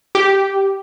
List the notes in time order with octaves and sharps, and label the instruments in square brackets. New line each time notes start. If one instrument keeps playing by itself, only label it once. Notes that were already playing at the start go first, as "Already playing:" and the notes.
[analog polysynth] G4